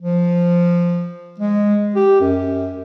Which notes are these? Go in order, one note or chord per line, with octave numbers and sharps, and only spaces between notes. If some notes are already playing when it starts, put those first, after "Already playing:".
F3
G#3
G4
F#2